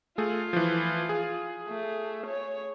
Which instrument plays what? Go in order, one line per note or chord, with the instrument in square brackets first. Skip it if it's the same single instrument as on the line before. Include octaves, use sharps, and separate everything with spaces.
[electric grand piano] A3 G#4 [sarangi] F4
[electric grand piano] E3 F3
G#4
[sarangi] A3
C#5